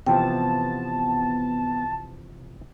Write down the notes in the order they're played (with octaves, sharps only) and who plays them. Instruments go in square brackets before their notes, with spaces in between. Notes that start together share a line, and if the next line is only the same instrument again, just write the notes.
[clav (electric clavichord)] C3 E3 F3 [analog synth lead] B3 [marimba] G5 [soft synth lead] A5